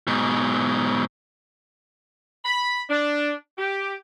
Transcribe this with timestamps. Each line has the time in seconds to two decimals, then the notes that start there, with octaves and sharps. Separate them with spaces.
0.07 G#2 B2
2.45 B5
2.89 D4
3.58 G4